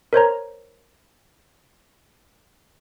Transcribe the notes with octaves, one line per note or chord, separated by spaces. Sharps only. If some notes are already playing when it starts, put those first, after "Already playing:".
A#4 C5 C#5 A#5